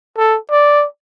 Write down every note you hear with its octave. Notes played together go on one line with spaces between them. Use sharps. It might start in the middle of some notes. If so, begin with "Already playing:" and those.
A4
D5